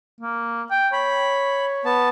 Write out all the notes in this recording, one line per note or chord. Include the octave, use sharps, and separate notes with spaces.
A#3
G5
C#5 B5
B3 A5